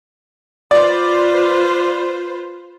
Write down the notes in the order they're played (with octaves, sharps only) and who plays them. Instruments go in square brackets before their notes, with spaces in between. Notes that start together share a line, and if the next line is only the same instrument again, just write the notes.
[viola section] F4 B4 C5 [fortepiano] D5